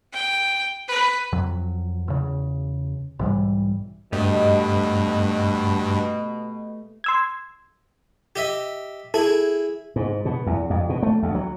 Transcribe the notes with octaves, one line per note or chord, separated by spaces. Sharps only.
G5
B4
F2 F#3
E2 C#3
B1 G#2 E3 G3
G2 B2 A3 G4 D#5
C6 E6 G#6
G4 D#5 E5
E4 G#4 A4
G#2
B2
E2
F2
B2
A3
D2
F#3